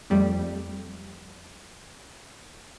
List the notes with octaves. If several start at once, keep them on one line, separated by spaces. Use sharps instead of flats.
F2 G3 A3